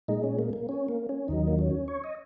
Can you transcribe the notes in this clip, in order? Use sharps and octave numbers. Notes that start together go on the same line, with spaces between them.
A#2 G#3 D#4
C#4
A#3
A#3
C#4
A#3
C#4
D#2 D#3 F#3 D#4
A#3
C#4
C#5
D#5